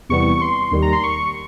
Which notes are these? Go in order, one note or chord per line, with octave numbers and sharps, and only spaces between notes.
E2 C3 E3 G3 B3 C#6
C6
D#2 D#3 G3
A#5
C6
C#6